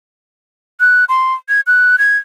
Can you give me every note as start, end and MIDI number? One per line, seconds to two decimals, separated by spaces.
0.80 1.05 90
1.09 1.34 84
1.49 1.61 92
1.67 1.96 90
1.99 2.17 92